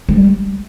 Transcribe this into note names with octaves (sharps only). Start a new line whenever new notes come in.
G3